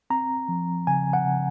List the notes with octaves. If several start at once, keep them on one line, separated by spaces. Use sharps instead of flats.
C4 A#5
F3
C#3 G#5
F#5
C#3